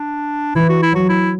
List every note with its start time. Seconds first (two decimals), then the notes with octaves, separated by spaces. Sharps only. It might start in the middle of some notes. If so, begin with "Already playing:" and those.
Already playing: D4
0.55 E3 E4
0.69 F#4
0.83 E4
0.93 F#3 F#4
1.09 E4